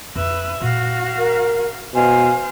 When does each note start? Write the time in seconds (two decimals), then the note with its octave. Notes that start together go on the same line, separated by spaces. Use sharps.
0.16 F2 E4 B4 E5
0.61 A#2 F#4 F5
1.17 A#4
1.95 B2 C5 F5 G#5